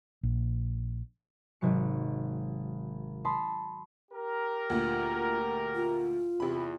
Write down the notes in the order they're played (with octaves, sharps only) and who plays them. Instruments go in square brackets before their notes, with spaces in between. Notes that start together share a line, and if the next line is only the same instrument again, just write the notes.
[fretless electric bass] A#1
[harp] G#1 C3 F#3 C#7
A5 B5 C6 D#6
[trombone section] G4 A#4
[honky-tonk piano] D2 A#2 [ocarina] F4
[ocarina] F4
[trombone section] E2 [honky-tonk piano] C3 B5